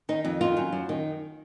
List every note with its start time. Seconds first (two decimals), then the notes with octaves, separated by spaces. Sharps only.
0.09 D#3 D#4
0.25 F2
0.41 D#3 F4
0.57 F#2
0.73 F#2
0.89 D#3